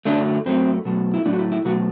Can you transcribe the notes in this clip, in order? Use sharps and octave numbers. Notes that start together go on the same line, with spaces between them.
F#2 D3 F#3 A3 D4
F#2 F#3 A3 C4
B2 F#3 A3
E4
A2 F#3 A3 D4
F#4
E4
E4
B2 F#3 A3 F#4